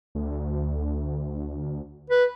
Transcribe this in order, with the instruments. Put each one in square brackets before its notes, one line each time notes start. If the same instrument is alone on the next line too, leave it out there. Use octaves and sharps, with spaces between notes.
[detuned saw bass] D2
[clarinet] B4